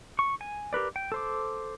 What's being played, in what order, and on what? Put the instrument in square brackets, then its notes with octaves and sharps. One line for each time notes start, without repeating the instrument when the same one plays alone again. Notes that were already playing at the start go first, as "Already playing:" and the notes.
[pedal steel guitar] C#6
G#5
G4 A#4 B4 D5
G5
A4 C5 D6